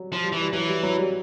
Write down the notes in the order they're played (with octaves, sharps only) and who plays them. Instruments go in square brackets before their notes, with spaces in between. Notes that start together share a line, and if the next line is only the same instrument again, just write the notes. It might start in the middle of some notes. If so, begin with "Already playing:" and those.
Already playing: [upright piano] F#3 G3
[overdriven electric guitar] F3
[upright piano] G3
[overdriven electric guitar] E3
[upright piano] G3
[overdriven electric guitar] E3 [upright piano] F#3
[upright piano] G3
F#3
G3